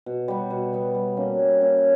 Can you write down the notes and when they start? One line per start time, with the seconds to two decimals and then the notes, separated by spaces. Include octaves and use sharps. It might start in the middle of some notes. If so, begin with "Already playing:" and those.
0.06 B2
0.28 G3 B3
0.50 B2
0.73 G3 B3
0.94 G3
1.17 A#3 C#4
1.39 G3
1.61 A#3 C#4